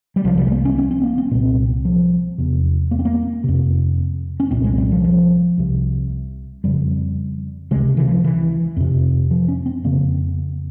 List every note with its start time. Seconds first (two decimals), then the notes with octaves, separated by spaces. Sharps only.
0.16 G3
0.24 C2 C3 F3
0.38 G3
0.47 G#3
0.52 A#3
0.65 C#4
0.78 C#4
0.91 C4
1.04 A#3
1.18 C4
1.31 C2 A#2
1.85 F3
2.38 E2 C3
2.91 A#3
2.99 C4
3.05 A#3
3.44 F2 C3
4.40 C#4
4.51 C2 A#2 C4
4.64 G#3
4.78 G3
4.91 F3
5.04 F3
5.58 C2 C3
6.64 F2 C#3 G3
7.71 C3 G#3
7.75 C#2
7.97 E3
8.06 F3
8.24 E3
8.77 F2 C3
9.31 F3
9.48 C#4
9.66 C4
9.84 F2 C#3 A#3